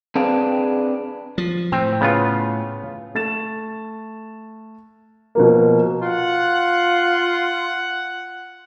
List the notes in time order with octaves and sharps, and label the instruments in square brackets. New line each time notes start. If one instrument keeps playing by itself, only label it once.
[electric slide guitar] C4 D4 G#4 B4 F5 G5
[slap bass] F3
[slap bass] A2 [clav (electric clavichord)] C4
[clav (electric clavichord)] C#3 B3 F4
[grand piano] A3 A6 E7
B2 F3 A#3
[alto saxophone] F4 [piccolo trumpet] F#5